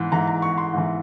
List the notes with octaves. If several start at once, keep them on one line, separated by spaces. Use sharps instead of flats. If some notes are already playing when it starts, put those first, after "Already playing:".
Already playing: G#2 E3
G#2 E3 A#5
A#5
C#6
C6
G#2 E3